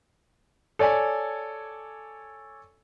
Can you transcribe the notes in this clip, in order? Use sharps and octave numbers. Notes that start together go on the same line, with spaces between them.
A4 C#5 D5 G#5